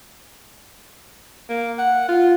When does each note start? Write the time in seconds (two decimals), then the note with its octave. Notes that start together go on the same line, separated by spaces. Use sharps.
1.49 A#3
1.78 F#5
2.08 F4